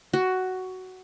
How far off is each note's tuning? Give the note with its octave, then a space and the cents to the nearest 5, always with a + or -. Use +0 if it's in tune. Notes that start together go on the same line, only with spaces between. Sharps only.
F#4 +10